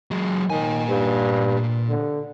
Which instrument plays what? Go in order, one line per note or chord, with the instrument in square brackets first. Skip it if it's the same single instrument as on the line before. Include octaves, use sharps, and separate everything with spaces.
[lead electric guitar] F#3 G#3
[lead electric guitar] A#2 G#5 [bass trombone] D#3
[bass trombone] G2
D3